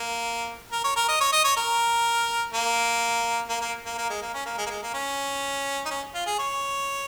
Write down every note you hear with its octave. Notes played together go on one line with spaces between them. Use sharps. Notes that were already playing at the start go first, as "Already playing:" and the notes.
Already playing: A#3
A#4
C#5
A#4
D#5
C#5
D#5
C#5
A#4
A#3
A#3
A#3
A#3
A#3
G#3
A#3
C#4
A#3
G#3
A#3
G#3
A#3
C#4
D#4
C#4
F4
G#4
C#5